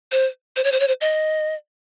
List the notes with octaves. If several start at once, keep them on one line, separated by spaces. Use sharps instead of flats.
C5
C5
C#5
C5
C#5
C5
D#5